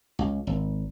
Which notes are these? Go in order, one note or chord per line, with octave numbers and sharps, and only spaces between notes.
C#2
G#1